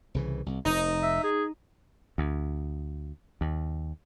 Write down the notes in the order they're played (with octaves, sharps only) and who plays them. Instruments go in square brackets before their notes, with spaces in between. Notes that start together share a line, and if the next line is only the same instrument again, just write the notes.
[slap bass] C2 C#3 E3
C2
[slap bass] F1 [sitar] D#4
[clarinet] E5
G#4
[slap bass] D2
D#2